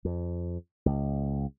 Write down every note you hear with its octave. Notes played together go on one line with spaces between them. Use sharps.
F2
C#2